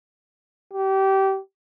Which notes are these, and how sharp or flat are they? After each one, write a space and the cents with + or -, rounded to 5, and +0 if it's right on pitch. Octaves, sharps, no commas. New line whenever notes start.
G4 -25